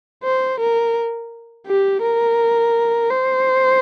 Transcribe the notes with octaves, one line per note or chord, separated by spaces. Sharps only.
C5
A#4
G4
A#4
C5